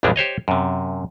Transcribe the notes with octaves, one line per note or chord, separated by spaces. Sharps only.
A#1 F2 E3 G3 G#3 D4
G4 C5 C#5 D#5
F#2 C3